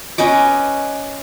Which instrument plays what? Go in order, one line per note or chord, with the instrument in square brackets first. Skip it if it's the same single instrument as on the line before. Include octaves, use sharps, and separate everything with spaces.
[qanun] C#4 B4 D#5 D6